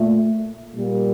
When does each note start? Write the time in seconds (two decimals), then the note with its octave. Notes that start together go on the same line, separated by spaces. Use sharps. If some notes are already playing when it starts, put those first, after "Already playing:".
Already playing: A#2 A3
0.76 A#2 G3 A#3